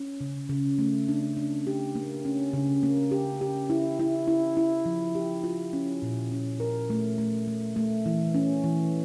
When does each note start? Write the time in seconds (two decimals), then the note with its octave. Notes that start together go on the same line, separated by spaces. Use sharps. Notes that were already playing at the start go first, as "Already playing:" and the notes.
Already playing: C#4
0.21 C#3
0.50 C#3
0.78 A3
1.08 D4
1.37 D4
1.67 G4
1.95 A#3
2.25 C#4
2.53 C#3
2.83 A#3
3.11 G4
3.41 G4
3.70 E4
3.99 E4
4.28 E4
4.57 E4
4.86 F3
5.15 G4
5.44 F4
5.73 C#4
6.02 A#2
6.31 C#4
6.60 A#4
6.90 A3
7.18 A3
7.47 A3
7.76 A3
8.06 E3
8.34 C#4
8.64 E3